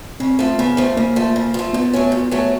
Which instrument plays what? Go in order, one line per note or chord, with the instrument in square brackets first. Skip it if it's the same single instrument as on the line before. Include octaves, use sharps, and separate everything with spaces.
[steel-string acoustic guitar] C#3 [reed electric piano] C4
[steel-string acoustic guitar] F3 A3
[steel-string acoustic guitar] C#3 [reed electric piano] B3
[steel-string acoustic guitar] F3 A3
[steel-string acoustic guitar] C#3 [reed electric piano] A#3
[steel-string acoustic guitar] F3 A3
C#3
F3 A3
[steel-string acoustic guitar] A#2 [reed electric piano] B3
[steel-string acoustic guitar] F#3 A3 C#4
A#2
F#3 A3 C#4